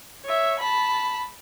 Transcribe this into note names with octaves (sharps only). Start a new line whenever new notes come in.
C#5 E5
A5 B5